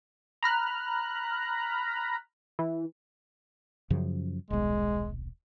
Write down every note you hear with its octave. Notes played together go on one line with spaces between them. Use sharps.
A#5 B5 F6 F#6
E3
F#2 C#3 F3
D#1 B1 G#3